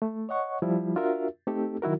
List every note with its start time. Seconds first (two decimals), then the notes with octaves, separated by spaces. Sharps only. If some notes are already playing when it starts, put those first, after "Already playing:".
0.02 A3
0.29 C#5 D#5 F#5 C#6
0.62 F3 G3 E4 F4
0.96 D4 F4 F#4 A#4 E5
1.47 A3 C4 D#4 G4 A4
1.82 D#3 F#3 E4 F#4 A#4